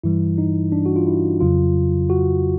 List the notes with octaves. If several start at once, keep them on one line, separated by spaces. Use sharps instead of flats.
G2 E3 G3 E4
D#4
D4
F#4
F4
E4
F2 C#3 F#3 F4
F#4